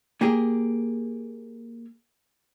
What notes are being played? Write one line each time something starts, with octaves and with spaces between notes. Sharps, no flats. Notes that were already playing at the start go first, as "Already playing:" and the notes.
A#3 G4 G#4